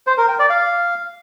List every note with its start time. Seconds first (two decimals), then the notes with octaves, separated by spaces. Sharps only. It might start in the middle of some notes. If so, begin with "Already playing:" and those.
0.07 C5
0.18 A#4
0.28 G5
0.39 D5
0.50 F5